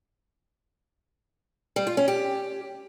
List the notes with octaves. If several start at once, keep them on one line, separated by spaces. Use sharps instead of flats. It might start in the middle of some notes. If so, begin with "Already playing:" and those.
G3
F4
C#4
G4